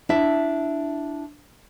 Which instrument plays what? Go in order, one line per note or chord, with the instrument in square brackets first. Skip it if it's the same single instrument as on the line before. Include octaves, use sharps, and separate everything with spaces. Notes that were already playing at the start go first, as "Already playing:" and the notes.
[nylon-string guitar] D4 E4 E5